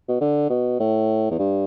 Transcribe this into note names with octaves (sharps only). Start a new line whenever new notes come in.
B2
D3
B2
A2
E2
G2